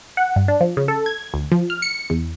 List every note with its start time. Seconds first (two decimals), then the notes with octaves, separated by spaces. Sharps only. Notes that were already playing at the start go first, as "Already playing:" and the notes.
0.17 F#5
0.36 G2
0.48 D4
0.61 F3
0.77 C#3
0.88 A4
1.06 G#6
1.34 D2
1.52 F3
1.70 F6
1.82 C#7
2.10 E2